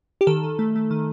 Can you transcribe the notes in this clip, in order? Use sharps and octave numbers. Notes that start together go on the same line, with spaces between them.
G4
D#3 A4
D#3
A3
A3
D#3